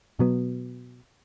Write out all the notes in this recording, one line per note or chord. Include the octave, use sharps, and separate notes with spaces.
B2 F#3 B3